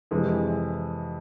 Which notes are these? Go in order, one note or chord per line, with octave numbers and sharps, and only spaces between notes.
F2 C3 E3 G#3